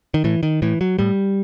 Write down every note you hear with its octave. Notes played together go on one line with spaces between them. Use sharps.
D#3
A2 E3
D#3
A2 E3
F#3
A2 G3